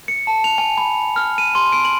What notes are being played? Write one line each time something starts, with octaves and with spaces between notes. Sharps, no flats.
C#7
A5
F7
G#5
B5
F6
D#7
C6
D7
F#7